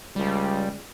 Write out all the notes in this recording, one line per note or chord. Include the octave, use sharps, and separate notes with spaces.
C#2 G3